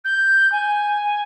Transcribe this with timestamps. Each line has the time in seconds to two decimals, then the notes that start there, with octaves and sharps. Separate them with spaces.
0.04 G6
0.51 G#5